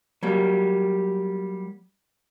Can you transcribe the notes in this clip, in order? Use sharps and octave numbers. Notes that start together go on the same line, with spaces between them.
F#3 G3 A#3